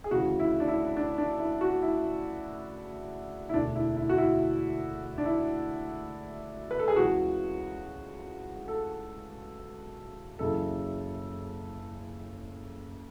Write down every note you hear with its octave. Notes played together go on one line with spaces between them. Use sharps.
G#4
D2 C#3 E3 F#4
E4
D4
E4
D4
D4
E4
F#4
E4
E4
E1 D2 D3 D4
E4
E4
F#4
E4
D4
E4
B4
A4
G#4
C#2 C#3 E3 F#4
A4
F#1 F#2 C#3 E3 A4